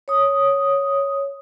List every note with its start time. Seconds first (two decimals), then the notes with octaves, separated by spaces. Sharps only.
0.08 C#5 D#6